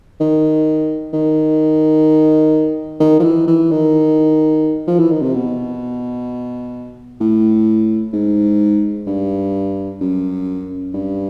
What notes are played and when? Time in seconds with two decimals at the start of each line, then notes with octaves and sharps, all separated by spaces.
0.20 D#3
1.13 D#3
3.00 D#3
3.20 F3
3.23 E3
3.47 E3
3.71 D#3
4.88 F3
4.99 E3
5.11 D#3
5.22 C3
5.34 B2
7.20 A2
8.13 G#2
9.07 G2
10.01 F#2
10.94 G2